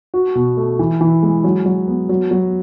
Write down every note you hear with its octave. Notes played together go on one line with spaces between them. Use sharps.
F#4
B2
A3
E3
E3
G#3
F#3
F#3
B3
F#3
F#3